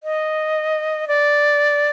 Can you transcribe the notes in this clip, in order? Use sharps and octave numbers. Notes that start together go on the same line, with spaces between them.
D#5
D5